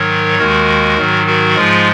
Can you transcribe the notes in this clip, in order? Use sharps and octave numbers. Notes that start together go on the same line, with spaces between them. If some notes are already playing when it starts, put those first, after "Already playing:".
Already playing: G#2 D#3 F#3 A#4 C#5
D#2 D#3 G#3 F#4 A#4
G#2 D#3 F#3
F#4 A#4
G#2 F3 G#3 F4 G#4